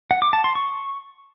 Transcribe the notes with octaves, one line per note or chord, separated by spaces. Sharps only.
F#5
D6
A5
C6
C#6